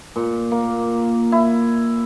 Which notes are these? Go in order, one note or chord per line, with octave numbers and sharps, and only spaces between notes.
A#2
A#3
E4